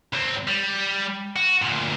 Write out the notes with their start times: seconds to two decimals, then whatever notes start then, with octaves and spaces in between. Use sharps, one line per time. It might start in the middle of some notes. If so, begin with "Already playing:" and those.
0.13 C#2 C4
0.48 G3
1.36 F#4
1.62 D2 A#2